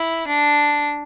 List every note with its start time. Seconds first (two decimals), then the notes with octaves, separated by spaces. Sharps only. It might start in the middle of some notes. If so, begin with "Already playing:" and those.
Already playing: E4
0.27 D4